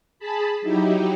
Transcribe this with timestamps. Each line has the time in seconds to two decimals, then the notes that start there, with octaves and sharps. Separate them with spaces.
0.19 G#4 A5 B5
0.62 F#3 D#4 E4 G4